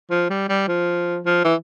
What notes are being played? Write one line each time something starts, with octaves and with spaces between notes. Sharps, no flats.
F3
G3
G3
F3
F3
E3